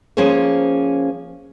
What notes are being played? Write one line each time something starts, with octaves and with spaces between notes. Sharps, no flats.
F3 A#3 C#4 G#4 C5 C#5